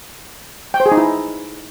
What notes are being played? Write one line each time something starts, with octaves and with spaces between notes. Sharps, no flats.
G5
C5
G#4
D#4
E4